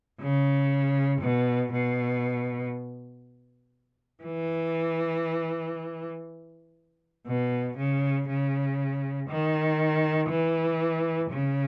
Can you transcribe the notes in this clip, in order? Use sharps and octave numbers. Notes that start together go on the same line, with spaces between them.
C#3
B2
B2
E3
B2
C#3
C#3
D#3
E3
C#3